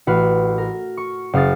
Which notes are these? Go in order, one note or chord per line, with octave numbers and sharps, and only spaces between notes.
A1 F#4 B4 F6 C7
A#4
C#6
F#1 F5 D#6 A6